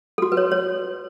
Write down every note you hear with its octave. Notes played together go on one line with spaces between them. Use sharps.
A4
F#4
B4
C#5
C#5